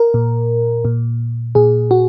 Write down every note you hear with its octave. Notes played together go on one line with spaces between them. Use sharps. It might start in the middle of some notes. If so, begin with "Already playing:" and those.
Already playing: A#4
A#2
A#2
A#2 G#4
F#4